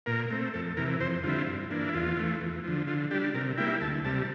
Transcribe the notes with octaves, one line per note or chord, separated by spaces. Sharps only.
A#2 A#4
A3 C4
F2 A4
C3 E3 A#4
F2 C5
D3 G3 C4 E4 F4
G2
E3 A#3 D4
E4
E2 F4
E3 A3
E2
D3 F3
D3 F4
G3 D4 G4
C3 A#4
G3 A#3 E4 G5
D2 A5
C3 G3 A5